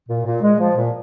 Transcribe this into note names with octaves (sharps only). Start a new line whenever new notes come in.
A#2
A#2
G#3
F3
A#2